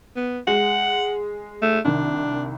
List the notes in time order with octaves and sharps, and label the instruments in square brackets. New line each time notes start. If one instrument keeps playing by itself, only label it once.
[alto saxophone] B3
[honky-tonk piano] G#3 [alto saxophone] F#5
[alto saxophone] A3
[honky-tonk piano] C2 D#3 [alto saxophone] D4